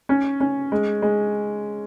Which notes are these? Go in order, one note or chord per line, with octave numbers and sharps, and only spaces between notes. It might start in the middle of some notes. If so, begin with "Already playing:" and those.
C#4
C#4
G#3
G#3